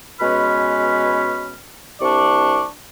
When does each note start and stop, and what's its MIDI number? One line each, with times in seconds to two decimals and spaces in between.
0.20 1.58 47
0.20 1.58 56
0.20 1.58 61
0.20 1.58 71
0.20 1.58 83
0.20 1.58 89
2.01 2.66 36
2.01 2.66 48
2.01 2.66 62
2.01 2.66 74
2.01 2.66 85